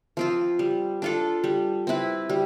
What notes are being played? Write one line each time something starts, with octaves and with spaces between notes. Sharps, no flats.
F3 C4 F4
G3
D4 F4 A4
G3
C4 E4 B4
G3